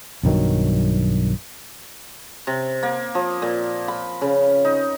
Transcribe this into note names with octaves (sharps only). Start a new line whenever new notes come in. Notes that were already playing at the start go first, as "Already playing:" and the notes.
B1 G2 D#3 F#3
C3
A#3
F3
A#2
B5
C#3
D#4